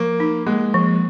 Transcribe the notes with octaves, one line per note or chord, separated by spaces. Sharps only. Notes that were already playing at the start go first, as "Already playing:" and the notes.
Already playing: F3 A#3
D#4
G#3 A#3
F3